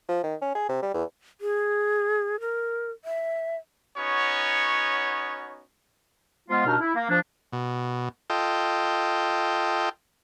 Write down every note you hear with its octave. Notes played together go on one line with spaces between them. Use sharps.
F3
D#3
C#4
G#4
C3
G3
E2
G#4
A#4
E5
B3 C#4 D#4 F#4 C#5
F3 G#3 B3 F4
D#2 B2 D4 D#4 F6
E4
A#3
F3 D4
B2
F4 A4 D#5 G5